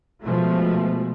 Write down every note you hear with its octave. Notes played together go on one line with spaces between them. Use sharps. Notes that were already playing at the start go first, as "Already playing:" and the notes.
B2 F3 G#3 A3